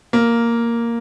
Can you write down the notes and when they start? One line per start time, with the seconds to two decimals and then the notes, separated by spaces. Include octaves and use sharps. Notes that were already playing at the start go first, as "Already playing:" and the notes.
0.13 A#3